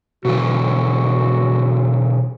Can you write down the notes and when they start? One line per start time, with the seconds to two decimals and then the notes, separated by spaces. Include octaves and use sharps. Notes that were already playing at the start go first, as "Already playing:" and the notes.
0.25 B2 D3 E3 F#4